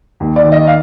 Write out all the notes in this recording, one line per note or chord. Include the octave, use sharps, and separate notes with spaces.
D#2
D5
D#3
D#5
F5